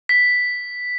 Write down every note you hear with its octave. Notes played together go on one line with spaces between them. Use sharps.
B6